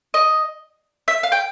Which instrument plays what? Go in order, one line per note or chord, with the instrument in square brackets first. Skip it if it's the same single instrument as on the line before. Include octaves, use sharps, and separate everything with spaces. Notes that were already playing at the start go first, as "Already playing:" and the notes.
[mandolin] D#5
E5
F5
G5